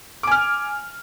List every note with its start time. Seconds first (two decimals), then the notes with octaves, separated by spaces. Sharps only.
0.23 D6
0.27 G#5
0.31 F6